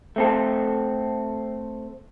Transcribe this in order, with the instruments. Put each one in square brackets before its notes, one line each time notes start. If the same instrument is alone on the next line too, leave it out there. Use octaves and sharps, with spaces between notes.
[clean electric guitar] A3 C4 A4